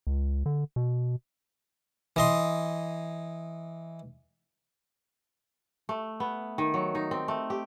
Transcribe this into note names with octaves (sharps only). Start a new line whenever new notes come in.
C#2
D3
B2
E3 D#5 C6
A3
B3
D#3
F#3
D#4
C4
A3
G4